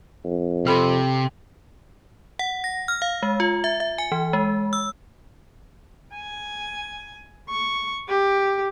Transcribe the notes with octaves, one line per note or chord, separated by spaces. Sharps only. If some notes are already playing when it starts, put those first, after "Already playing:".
F2
C3 A4 B5
F#5
A#6
F6
F5
G#3
F4
E5
E5
G#5
E3
G#3
E6
G#5
C#6
G4